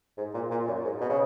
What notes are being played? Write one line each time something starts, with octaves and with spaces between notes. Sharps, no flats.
G#2
A#2
A#2
F#2
G#2
B2
C#3